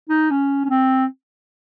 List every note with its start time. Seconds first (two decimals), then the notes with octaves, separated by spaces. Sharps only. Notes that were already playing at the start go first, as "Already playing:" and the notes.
0.09 D#4
0.30 C#4
0.65 C#4
0.70 C4